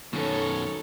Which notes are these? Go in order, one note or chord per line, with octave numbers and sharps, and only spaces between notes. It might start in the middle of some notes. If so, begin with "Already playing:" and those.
F#2 B2 D#3 F#3 A4 C#5